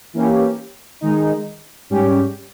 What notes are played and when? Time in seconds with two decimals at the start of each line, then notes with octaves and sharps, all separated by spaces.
0.13 E3 A#3 C#4 G4
1.01 D#3 G#3 D#4
1.90 G#2 G3 C#4 G4